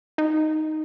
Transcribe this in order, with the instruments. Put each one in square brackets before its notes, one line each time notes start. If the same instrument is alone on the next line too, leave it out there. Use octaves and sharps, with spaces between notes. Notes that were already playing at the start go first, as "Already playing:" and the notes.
[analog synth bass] D#4